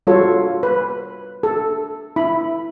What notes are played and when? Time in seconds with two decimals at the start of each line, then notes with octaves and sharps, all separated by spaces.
0.07 G3 F4 F#4 A4 C#5
0.63 B4
1.43 A4
2.16 E4 B5